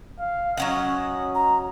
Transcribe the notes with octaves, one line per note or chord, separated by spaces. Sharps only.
F5
F#3 C#4 D#5 F#5
A#5